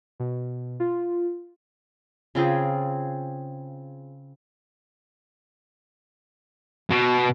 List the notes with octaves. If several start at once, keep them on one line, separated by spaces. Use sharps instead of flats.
B2
F4
C#3 C4 F4 G#4
B2